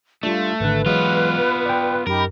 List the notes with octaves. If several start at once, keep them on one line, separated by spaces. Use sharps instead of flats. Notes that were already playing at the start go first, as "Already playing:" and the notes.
G3 A3 D4 F4
G#1 D3 B4 F#6
E3 F#3 G#3 B3 F4
D5 G5
F#2 D#4 G4 A#4 B5